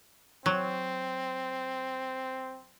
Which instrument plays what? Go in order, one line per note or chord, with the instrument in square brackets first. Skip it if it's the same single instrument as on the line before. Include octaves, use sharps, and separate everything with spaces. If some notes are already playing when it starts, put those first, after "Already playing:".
[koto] F#3 [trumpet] C4